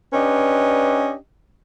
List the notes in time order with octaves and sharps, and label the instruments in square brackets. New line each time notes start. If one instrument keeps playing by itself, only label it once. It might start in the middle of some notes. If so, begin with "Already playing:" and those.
[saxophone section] C#4 D4 G4 B4 D#5